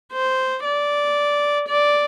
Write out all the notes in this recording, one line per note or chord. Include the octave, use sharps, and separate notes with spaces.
C5
D5
D5